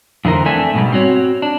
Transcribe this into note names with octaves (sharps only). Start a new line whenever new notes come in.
F2 D3 E3 A#4 C5
A3 C4 D4 E5 G#5
G#2 B2 G3
C4 F#4 C#5
D4